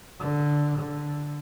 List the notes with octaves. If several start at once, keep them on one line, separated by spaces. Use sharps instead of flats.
D3
D3